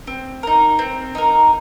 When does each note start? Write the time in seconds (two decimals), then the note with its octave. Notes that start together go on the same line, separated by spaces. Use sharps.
0.07 C4
0.43 D#4 A#4
0.79 C4
1.15 D#4 A#4